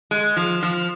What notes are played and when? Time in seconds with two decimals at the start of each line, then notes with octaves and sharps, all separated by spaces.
0.11 G#3
0.36 F3
0.63 F3